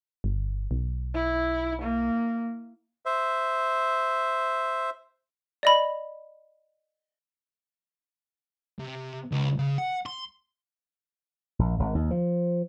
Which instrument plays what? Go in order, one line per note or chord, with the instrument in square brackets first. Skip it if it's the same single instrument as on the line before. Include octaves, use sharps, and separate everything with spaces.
[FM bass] G1
B1
[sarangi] E4
A#3
[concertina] C5 E5
[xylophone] D5 D#5 B5
[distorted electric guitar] C3
C#2
C#3
F#5
C6
[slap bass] A#1
G#1
D#2
F3